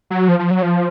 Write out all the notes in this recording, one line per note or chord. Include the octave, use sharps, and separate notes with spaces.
F#3
F3
F3
F#3
F3